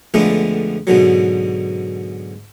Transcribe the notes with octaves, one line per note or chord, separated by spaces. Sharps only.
F2 D3 G#3 A3 B3 D4
G#2 B2 D3 F#3